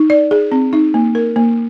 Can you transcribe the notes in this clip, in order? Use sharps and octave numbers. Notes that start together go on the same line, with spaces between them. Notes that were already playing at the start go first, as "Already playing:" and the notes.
Already playing: D#4
D5
G#4
C4
D#4
A#3
A#4
A#3